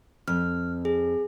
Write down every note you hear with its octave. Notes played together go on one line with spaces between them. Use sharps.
F2 F6
G#4